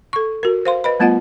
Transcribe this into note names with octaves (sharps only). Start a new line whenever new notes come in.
A4 C#6
F#4 A#4
C5 F5 C6
B4 D#5 B5
G3 A3 B3 F4 D#5 F#5